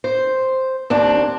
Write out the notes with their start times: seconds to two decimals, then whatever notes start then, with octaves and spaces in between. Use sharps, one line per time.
0.04 C5
0.90 D#2 C4 D4